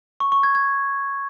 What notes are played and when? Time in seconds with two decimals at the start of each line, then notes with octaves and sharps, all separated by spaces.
0.20 C#6
0.32 C#6
0.43 G#6
0.55 G#6